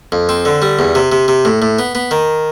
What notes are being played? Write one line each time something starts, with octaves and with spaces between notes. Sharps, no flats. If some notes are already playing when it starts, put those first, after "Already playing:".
F2
C4
D3
G3
E2
C3
C3
C3
A2
A2
B3
B3
D#3